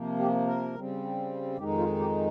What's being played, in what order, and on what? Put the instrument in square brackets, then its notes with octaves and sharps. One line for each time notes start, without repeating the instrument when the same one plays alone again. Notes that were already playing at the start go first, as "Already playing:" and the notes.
Already playing: [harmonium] C3 F3 A#3
G4
A#4
C#3 G3 C4
F2 D#3 G#3 D#4 G4
F4
G4